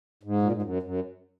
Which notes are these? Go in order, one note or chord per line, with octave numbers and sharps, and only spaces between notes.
G#2
A#2
G#2
F#2
F#2